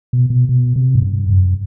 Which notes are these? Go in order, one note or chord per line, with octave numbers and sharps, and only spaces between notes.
B2
B2
B2
C3
G#2
G2
F#2